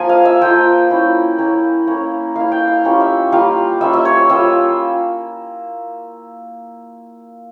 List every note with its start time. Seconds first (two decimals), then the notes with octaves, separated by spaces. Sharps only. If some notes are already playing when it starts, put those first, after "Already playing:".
Already playing: F3 A#3 F4 G#5
0.09 F5
0.25 E5
0.41 F3 A#3 F4 G5
0.90 A#3 C#4 E4
1.38 A#3 C#4 E4
1.87 A#3 C#4 E4
2.36 A#3 C#4 E4 F5
2.52 G5
2.68 F5
2.84 G3 A#3 C#4 F4
3.00 E5
3.32 G3 A#3 C#4 F4 F5
3.81 G3 A#3 C#4 F4 E5
3.93 E5
4.05 C#5
4.29 G3 A#3 C#4 F4 E5